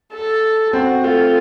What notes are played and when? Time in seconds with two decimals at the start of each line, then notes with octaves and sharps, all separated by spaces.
0.14 A4
0.73 C4 F#4
1.04 A3 F4